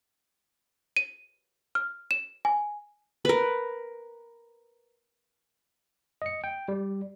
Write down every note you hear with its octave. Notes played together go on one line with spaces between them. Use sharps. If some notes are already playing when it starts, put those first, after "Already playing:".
D#7
F6
E7
G#5
A#4 B4
D#5 C#7
G5
G3